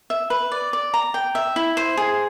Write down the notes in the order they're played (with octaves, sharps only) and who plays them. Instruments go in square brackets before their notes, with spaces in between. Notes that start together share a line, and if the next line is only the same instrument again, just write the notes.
[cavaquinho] E5
B4
D5
D5
A#5
G5
E5
E4
C5
G#4